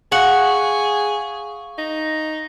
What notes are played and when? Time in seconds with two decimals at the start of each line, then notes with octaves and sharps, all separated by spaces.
0.12 G#4 F5 F#5 C#6
1.78 D#4